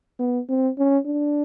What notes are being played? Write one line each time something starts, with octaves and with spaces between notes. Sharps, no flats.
B3
C4
C#4
D4